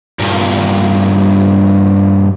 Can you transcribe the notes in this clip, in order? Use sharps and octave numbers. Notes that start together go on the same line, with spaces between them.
G2 A#2